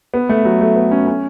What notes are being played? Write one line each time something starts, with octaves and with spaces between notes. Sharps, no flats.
B3
A3
F#3
A3
B3
C#4
C#4